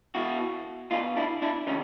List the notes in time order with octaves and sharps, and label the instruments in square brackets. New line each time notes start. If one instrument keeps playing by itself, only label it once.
[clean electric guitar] B2 E4 F#4
B2 D#4 F4
D4 E4
D4 E4
C3 D#3 C#4 D#4